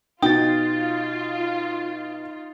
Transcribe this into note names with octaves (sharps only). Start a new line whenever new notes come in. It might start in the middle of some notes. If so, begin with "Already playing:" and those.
B2 D#4 F4 G5 D#6 A6